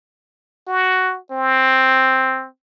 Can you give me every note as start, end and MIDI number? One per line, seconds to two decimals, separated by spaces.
0.67 1.18 66
1.31 2.47 60